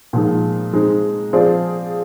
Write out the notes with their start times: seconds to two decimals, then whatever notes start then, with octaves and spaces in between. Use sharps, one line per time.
0.13 A#2 F3 G#3 D#4
0.73 G#3 C4 D#4
1.33 F3 C4 F4 G#4 D5